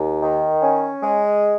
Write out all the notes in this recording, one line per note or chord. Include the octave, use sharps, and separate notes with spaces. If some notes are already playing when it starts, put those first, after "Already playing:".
Already playing: D#2
D#3
C#4
G#3